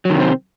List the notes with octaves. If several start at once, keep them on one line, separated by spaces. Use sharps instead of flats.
C3 D#3 F#3 C4